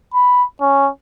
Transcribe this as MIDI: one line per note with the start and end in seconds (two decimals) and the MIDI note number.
0.14 0.44 83
0.61 0.89 61